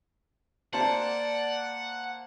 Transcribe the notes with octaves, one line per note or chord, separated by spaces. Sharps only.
A#3 C5 D5 F#5 A5